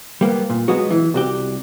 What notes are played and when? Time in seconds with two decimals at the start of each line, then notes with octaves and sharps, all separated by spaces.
0.21 G3 A#3 B3
0.50 A#2
0.68 F#3 G#3 B3 F#4
0.90 E3
1.14 C2 F#4 G4